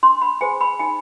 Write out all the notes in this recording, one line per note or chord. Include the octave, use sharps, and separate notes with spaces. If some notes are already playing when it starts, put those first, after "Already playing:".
D4 C6
B5
G#4 C5 G#5
B5
D#4 G#5